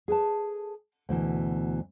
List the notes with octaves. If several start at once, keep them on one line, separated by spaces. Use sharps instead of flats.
G#4 A4 B4 A5
D2 B2 E3